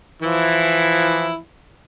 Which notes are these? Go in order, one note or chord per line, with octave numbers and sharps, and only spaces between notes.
E3 F3 E4